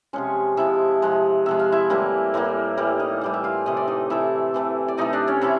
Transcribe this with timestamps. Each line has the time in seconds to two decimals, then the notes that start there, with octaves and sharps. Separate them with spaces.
0.13 C3 F3 G#3 C#4 C#5
0.57 C3 F3 G#3 E4 E5
1.02 C3 F3 G#3
1.46 C3 F3 G#3 E5
1.59 F5
1.72 E4 E5
1.90 A2 E3 G3 A#3
2.34 A2 E3 G3 A#3
2.77 A2 E3 G3 A#3
2.99 D#4 D#5
3.21 A2 E3 G3 A#3
3.34 E5
3.44 F4 F5
3.66 C3 E3 A3 D#5
3.77 D5
3.88 D#4 D#5
4.10 C3 E3 A3 E4 E5
4.54 C3 E3 A3
4.88 D5
4.98 C3 E3 A3 D#4 D#5
5.13 D4 D5
5.27 C#4 C#5
5.41 C3 E3 E4 E5